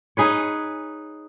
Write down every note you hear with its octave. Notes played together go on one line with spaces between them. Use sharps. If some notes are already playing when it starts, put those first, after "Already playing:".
D#4 G#4 B4 C#5